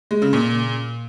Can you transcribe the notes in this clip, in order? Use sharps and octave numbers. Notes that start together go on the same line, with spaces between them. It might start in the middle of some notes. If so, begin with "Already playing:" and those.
G#3
C#3
A#2